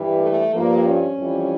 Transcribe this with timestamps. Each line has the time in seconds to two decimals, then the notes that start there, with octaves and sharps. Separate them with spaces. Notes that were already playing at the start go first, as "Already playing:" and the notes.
Already playing: G2 E3 G3
0.21 A3
0.53 G2 F3 A#3
0.85 C#4
1.17 F2 E3 G3